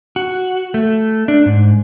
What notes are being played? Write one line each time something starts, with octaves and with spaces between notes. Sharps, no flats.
F#4
A3
D4
G#2